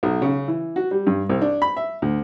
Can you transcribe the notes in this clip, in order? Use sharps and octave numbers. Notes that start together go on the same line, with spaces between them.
B1
C#3
E3
F#4
G3
G2
C2
D4
B5
E5
D2